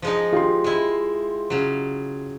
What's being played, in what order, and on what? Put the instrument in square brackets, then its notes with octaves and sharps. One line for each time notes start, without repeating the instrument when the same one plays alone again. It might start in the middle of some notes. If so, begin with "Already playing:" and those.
[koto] F3 G#3 D#4
[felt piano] F4 G4 C6
[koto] G#3 E4
C#3 F#3